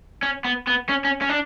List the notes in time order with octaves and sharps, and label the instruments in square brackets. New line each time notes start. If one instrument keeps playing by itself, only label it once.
[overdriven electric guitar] C#4
B3
B3
C#4
C#4
C#4
D4